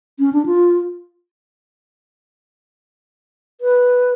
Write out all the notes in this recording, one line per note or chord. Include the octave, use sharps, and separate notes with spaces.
C#4
D4
F4
B4